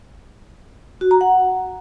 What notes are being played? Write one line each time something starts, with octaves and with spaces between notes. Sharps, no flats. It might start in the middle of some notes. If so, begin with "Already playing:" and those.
F#4
A#5
F#5